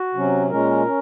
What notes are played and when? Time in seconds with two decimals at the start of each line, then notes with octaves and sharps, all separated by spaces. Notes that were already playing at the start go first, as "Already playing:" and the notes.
Already playing: F#4
0.14 C3 F#3 C#4
0.50 A#2 G#3 C#4 A#4
0.86 C#4